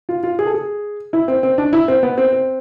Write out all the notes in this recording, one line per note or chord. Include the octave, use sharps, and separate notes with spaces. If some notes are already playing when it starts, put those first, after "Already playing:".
F4
F4
G#4
A4
G#4
E4
C4
C4
D4
E4
C4
B3
C4
C4